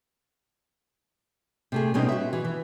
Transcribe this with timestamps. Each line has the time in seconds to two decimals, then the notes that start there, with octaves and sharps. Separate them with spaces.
1.72 C3 A3 G#4
1.94 B2 G3 C4 C#4 D#4 G4
2.09 F#4 E5
2.33 E3
2.45 E3